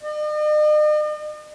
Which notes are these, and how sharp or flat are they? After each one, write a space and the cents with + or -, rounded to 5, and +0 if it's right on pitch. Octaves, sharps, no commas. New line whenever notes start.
D#5 -45